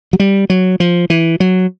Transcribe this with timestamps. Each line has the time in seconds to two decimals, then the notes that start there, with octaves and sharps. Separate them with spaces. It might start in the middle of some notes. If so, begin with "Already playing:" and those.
0.13 F#3
0.20 G3
0.50 F#3
0.80 F3
1.10 E3
1.40 F#3